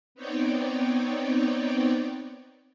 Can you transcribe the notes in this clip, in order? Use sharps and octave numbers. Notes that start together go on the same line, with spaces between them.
B3 C4 D#4 C#5 D5 G5